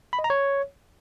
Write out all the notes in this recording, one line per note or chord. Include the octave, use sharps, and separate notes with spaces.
B5
D#5
A#5
C#5